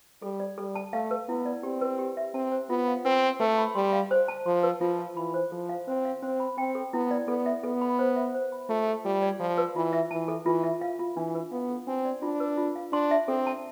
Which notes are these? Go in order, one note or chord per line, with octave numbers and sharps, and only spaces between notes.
G3 A4
D5
G3 A4
A5
A3 F5
B4
B3 E4
D5
C4 G4
B4
G4
E5
C4 A5
C5
B3 F4
F5
C4 B4
F5
A3 B4
B5
G3 C6
F5
C5
A5
F3 C6
B4
F3 F4
F5
E3 B5
C5
F3 A4
F5
C4 C5
F5
C4 C5
B5
C4 G5
A4
B3 E4
D5
B3 A4
E5
B3 A4
B5
C5
E5
C5
B5
A3 F4
A4
G3 F4
D5
F3 F4
B4
E3 F4
E5
E3 A5
A4
E3 F4
E5
F5
F4
E3 D4
B4
B3 F5
A4
C4 D4
D5
D4 F4
B4
F4
F5
D4 C6
E5
C4 A4
A5